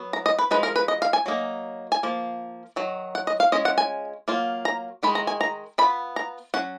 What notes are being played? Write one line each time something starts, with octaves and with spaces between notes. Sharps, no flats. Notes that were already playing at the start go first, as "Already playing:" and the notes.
Already playing: F#3 B3
A#5
D#5
B4
F3 G#3 D#4 B4
A#4
B4
D#5
F5
G#5
F#3 A#3 D#4
G#5
F3 A#3
D#3 F#3
F#5
D#5
F5
G#3 C#4 F4 D#5
F#5
G#5
F#3 A#3 F4
A#5
D#3 G#3 D#4 B5
A#5
G#5
A#5
F#3 B3 F4 B5
A#5
F#3 C#4 F#5